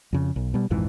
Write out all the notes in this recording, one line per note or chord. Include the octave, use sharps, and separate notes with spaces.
F2 C#3
B1
B2 G3
A#1 F2 G#2 E3